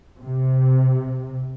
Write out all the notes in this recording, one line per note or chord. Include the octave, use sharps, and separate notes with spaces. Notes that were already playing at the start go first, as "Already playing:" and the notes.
C3